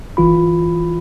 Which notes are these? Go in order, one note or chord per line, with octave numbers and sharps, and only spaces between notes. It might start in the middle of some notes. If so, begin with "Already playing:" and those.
G1 E3 F4 B5